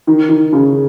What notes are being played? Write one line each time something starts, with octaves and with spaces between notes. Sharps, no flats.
D#3
D#3
C#3